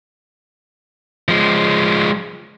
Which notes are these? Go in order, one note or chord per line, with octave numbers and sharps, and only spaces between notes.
F3 G#3